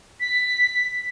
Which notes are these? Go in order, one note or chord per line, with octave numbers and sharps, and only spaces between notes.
B6